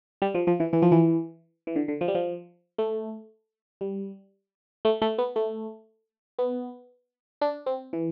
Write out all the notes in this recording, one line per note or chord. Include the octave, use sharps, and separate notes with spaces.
G3
F3
F3
E3
E3
F3
E3
E3
D3
D3
F3
G3
F3
A3
G3
A3
A3
B3
A3
B3
D4
C4
E3